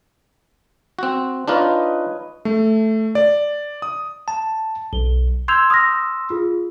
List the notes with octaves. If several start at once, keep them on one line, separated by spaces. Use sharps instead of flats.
C4 F#4
D4 D#4 F4 B4 C#5 D#5
A3
D5
D#6
A5
B1 G7
C6 E6 G6 G#6 F7
D#6 F6 A#6
F4 G#4